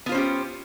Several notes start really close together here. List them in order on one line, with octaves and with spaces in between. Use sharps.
B3 F4 C5 C#4 G4